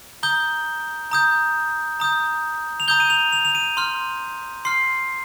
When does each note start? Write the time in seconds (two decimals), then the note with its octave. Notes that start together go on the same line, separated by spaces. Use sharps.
0.23 A#5 D#6 G6 G7
1.11 A#5 D#6 G6
2.00 A#5 D#6 G6
2.80 F7
2.88 A#5 D#6 G6 G7
3.00 D#7
3.10 F7
3.33 F7
3.45 F7
3.55 D#7
3.77 C6 F6
4.65 C6 F6 C7